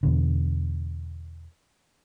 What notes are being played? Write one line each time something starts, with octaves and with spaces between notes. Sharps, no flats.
E2 B2 D3